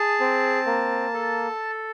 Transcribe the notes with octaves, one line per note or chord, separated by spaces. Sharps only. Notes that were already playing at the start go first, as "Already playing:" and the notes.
Already playing: G#4 A5
C4
A#3
A4